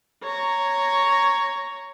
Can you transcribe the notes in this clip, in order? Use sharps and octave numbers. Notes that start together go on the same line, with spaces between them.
C#5 A#5